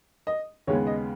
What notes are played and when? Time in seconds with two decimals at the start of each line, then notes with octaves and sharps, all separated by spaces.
0.27 D#5
0.67 D#2 C#3 G#3 B3 C#5
0.87 D#5